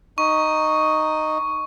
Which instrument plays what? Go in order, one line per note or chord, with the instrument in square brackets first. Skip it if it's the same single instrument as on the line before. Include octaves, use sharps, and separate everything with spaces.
[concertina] D#4 [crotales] C#6